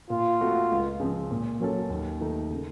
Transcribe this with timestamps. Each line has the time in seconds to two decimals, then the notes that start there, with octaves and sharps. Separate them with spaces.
0.10 A#2 F4
0.41 A3 C4 F#4
0.71 C#2
1.00 C#3 F3 C4
1.31 A#2
1.60 F#3 A#3 C#4 A4
1.90 D#2
2.21 D#3 A3 D#4
2.51 C#3